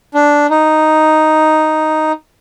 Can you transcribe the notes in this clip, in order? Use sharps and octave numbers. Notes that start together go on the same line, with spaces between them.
D4
D#4